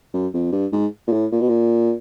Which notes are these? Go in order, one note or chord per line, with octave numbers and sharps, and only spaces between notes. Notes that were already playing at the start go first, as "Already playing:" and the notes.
F#2
F2
G2
G#2
A#2
A2
A#2
B2
A#2